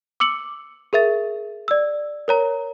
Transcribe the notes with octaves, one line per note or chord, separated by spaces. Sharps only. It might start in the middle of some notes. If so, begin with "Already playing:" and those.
D6 E6 C#7 F#7
G#4 A#4 E5 A6
D5 E6
A#4 C#5 A#5